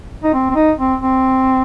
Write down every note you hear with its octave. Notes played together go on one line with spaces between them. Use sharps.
D#4
C4
C4
D#4
C4
C4